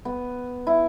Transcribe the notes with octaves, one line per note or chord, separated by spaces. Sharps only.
B3
E4